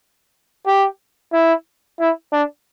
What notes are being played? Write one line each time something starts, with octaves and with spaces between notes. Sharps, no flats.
G4
E4
E4
D4